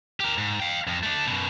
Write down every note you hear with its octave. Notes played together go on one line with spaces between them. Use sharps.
G4 A#4
G#2
F5 G5
F2
A3 D4
F#2 B2